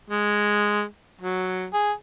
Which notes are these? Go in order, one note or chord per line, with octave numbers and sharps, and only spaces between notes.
G#3
F#3
G#4